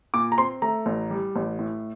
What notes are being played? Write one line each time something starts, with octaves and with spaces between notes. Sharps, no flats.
A#2 D6
A#5
C4 C6
A3 A#5
A1
G3
A1
A2